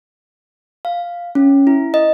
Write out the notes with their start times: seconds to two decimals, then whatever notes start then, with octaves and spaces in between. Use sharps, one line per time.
0.85 F5
1.35 C#4
1.67 E4
1.94 D#5